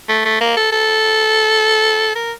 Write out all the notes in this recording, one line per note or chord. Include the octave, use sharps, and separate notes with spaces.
A3
A3
A#3
A4
A4
A#4